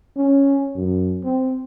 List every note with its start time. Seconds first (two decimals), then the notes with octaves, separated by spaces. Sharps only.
0.16 C#4
0.76 F#2
1.23 C4